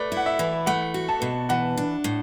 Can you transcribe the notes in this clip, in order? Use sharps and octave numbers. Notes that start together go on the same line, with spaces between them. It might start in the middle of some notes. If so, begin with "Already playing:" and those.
Already playing: A3 B4 D5
E4 F#5
E5
E3
A3 F#5
F#4
A5
B2
E3 F#5
D4
A2